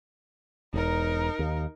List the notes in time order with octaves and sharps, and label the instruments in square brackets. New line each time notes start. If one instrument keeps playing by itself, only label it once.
[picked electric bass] E1 [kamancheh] D#4 A#4
[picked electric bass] D#2